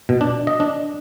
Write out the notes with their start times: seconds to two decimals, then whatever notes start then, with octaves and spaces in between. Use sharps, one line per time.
0.09 B2
0.21 D4
0.47 D#5
0.60 D4